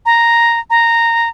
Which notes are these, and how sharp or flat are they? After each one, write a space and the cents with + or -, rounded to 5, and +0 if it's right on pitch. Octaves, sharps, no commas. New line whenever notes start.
A#5 +0
A#5 -10